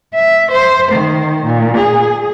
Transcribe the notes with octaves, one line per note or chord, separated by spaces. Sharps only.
E5
C5
D#3
A#2
G#4